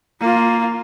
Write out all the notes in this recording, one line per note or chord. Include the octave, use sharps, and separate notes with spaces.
A#3 F4